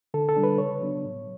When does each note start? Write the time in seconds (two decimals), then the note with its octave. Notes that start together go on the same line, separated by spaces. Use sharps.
0.14 D3 A4
0.29 A4
0.36 G3 D4
0.43 B4
0.58 C#3 C#5
0.81 F#3 B3 D4
1.04 A2